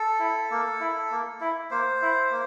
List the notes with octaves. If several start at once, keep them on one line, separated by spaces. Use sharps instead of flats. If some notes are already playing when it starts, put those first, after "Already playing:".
Already playing: A4
E4
A#3
E4
A#3
E4
A#3 C5
E4
A#3